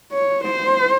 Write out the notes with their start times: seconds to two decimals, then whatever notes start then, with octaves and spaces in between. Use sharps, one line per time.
0.13 C#5
0.44 C5